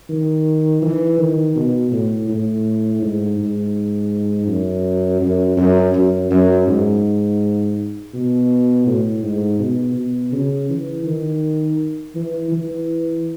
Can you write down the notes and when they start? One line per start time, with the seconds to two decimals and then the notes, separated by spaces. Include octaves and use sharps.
0.09 D#3
0.82 E3
1.18 D#3
1.55 B2
1.92 A2
2.28 A2
3.02 G#2
3.38 G#2
4.48 F#2
5.21 F#2
5.57 F#2
5.94 F#2
6.31 F#2
6.67 G#2
8.13 B2
8.86 A2
9.23 G#2
9.59 B2
9.96 B2
10.32 C#3
10.70 E3
11.05 D#3
12.15 E3
12.52 E3